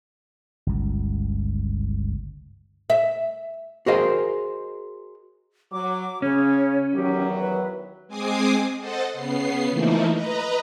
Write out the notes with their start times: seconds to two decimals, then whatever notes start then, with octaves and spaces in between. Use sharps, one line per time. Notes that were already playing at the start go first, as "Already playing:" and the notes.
0.67 G1 C#2
2.90 E5
3.86 F#4 G#4 A#4 C5 D#5 F5
5.72 F#3 D6
6.22 C#3 C#4 C#5
6.93 E2 D#3 F#3 G4
7.40 B4
8.08 G#3 C4 G#5 D6 D#6 C7
8.79 A4 C5 D#5 F#5 A5
9.13 C#3 B3 C7
9.69 E3 F3 A3 A#3 D#4 E4
10.10 B4 D#5 A#5